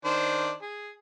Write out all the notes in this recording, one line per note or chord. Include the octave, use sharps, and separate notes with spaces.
D#3 D4 C5
G#4